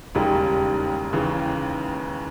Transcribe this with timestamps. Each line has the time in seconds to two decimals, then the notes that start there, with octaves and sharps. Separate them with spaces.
0.15 E1 D#2 C#3 G3
1.13 D#2 C#3 E3